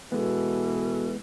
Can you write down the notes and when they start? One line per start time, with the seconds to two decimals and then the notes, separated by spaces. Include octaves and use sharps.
0.12 B2 E3 G#3 B3 A4